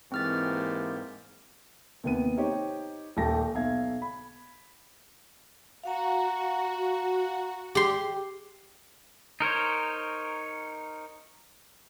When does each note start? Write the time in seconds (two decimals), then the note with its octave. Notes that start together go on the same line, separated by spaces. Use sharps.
0.12 G#2 E3 A#3 C4 G4 F6 A6
2.04 D#2 C3 B3 D#7
2.37 D#4 G4 C5 C#5 D#5
3.17 D#1 G4 A4 G5 A5 A#6
3.55 B1 E5 F5 G#6
4.02 B5
5.84 F#4 F5 F#5 A#5
7.75 G4 G#4 C6
9.40 D#4 A#4 C5 C#5